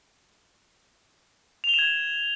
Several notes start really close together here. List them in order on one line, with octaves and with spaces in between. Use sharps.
F7 G7 E7 G#6